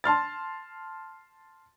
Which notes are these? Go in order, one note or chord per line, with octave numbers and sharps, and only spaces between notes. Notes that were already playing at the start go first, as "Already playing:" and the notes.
A5 C6 F6 A6